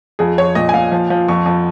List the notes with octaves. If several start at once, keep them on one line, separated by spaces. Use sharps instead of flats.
F2 G#4
F2 C#5
A#2 D#5
G#5
A#2 F5
F3
F3
F2 C#6
F2